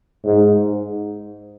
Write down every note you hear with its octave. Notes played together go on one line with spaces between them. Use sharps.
G#2